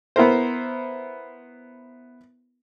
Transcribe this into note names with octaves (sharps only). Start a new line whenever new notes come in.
B3 E4 A#4 C5